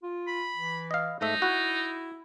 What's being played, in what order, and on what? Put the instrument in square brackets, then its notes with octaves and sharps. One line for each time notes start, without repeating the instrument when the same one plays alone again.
[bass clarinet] F4
[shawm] B5
[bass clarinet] E3
[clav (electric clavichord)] D#5 F5
[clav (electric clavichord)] G#2 A3 E5 [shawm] D#4
[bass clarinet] E4 [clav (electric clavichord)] F#4